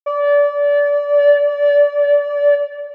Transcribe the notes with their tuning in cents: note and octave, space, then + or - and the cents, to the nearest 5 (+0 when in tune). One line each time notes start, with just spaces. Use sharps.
D5 -25